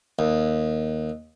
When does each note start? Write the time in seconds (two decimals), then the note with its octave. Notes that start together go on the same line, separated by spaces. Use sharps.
0.19 D#2